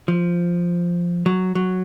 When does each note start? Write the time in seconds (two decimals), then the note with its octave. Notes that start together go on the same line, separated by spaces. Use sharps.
0.08 F3
1.26 F#3
1.55 F#3